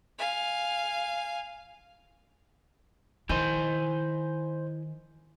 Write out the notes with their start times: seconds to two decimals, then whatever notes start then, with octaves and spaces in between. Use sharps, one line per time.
0.18 F5 G#5
3.29 D#3 E4 C5 D#5 G#5 G6